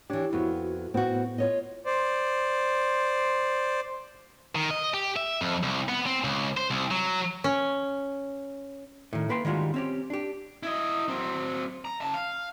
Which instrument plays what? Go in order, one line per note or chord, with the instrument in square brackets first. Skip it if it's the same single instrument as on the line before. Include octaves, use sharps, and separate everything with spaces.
[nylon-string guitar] E3 D4 [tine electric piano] G4 C#5
[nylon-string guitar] F2 B3 [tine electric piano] E4 F#4
[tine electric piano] A2 B3 [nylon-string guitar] C4 F#4
[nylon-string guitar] F4 C#5 D#5
[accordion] C5 D5
[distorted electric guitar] D#3
D#5
G4
E5
F2
C2
B3
C4
C#2
C5
C2
F#3
[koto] C#4
[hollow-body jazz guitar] A2 D#3
A#3 B4 G5 C6
D#3 G3 G#3 F4 F#4
C4 C#4 G4
D4 G4
[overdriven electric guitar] E4 D#5
F#3 C4
A#5
C#3 A5
F5